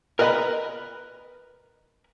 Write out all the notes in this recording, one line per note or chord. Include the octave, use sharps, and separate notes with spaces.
A#4 B4 D#5 F#5 A#5 B5